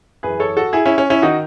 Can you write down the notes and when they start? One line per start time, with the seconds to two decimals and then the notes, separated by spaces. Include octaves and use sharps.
0.23 F#2 E3 G#4 B4
0.40 A4 C#5
0.57 F#4 A4
0.73 E4 G#4
0.86 C#4 E4
0.98 C#4
1.10 C#4 E4
1.22 D#3 D#4 F#4